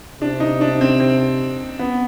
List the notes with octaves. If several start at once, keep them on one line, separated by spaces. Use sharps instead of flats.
C3 D4
D#4
D4
C4
C4
B3